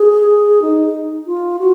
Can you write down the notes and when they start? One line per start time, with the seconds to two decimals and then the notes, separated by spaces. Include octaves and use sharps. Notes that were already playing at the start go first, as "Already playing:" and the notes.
Already playing: G#4
0.62 D#4
1.27 F4
1.59 F#4